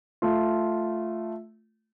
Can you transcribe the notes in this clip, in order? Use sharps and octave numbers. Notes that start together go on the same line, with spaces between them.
A3 F4